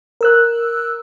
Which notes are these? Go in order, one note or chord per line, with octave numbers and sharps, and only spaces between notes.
A#4 E6 F#6